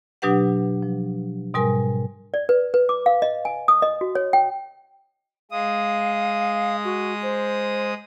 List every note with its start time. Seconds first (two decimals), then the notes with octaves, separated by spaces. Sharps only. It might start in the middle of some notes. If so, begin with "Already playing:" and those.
0.22 B2 F#3 D4 G4 B4 F#5
0.82 F3
1.54 G#2 B2 G3 A#4 G#5
2.34 D5
2.49 B4
2.74 B4
2.89 D6
3.06 F5
3.22 D#5
3.45 G#5
3.68 D#6
3.82 D#5
4.01 F#4
4.15 C#5
4.33 G5
5.51 G#3 F5 D#6
6.85 F#4
7.23 C5